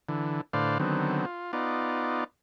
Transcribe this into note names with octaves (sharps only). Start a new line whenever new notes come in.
D3 E3
A2 D3 B4 C5 D5 F5
D3 D#3 F#3 B3 C4
F4
B3 D#4 F4 D5